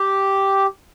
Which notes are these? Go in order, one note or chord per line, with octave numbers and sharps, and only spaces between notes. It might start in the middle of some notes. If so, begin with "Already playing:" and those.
Already playing: G4